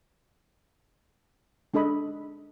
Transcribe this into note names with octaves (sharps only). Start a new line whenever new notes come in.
G#3 D4 A4 D#5 B5